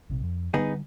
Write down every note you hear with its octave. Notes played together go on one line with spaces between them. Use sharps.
A#1 C3
F2
D3 F#3 G3 B3 D#4 G#4